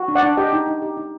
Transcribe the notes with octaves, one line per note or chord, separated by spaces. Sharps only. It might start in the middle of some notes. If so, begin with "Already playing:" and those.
Already playing: F#4
D4
D5 F#5
D4
G4 D#5 G5
D#4
D#4
G4
D#4